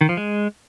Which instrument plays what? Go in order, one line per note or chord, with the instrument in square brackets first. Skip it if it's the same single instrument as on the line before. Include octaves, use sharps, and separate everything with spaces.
[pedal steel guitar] D#3
F3
G#3